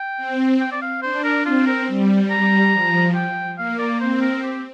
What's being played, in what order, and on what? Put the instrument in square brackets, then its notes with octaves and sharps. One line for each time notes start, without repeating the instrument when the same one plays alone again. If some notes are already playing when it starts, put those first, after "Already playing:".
Already playing: [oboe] G5
[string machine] C4
[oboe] G5
D5
F5
[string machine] D4 [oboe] C5
[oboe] A#4
[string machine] C4 [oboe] F4
[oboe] A#4
[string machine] G3
[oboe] A#5
[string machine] F3
[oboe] G5
[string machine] A#3 [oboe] F5
[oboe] D5
[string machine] C4 [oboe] C5
[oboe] A#4
G4